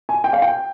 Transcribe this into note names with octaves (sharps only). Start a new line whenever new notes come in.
G#5
G5
F5
G5